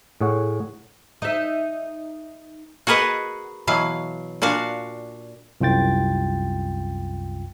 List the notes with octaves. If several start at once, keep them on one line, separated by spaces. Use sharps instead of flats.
A2 G#4 C#5 F#5
D#4 E5
F#4 G#4 A#4 B4 D#5 F#5
B2 E3 F#3 F5
A#2 D4 F#4 F5
C2 F#2 F4 G5 A6